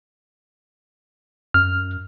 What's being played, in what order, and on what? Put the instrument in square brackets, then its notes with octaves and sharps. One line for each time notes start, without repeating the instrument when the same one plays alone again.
[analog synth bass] F#2 [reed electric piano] F6